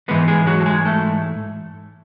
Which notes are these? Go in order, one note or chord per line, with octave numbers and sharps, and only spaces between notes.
G#2 E3 G#3 B3 B4
G#3 G#4
F#3 F#4
A4
G#3 G#4
A3 A4